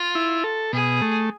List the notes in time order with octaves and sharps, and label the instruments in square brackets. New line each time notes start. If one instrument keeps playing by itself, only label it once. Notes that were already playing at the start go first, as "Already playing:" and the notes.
Already playing: [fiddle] F4
[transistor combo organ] E4
A4
[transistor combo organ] B2 [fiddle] G#4
[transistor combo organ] A3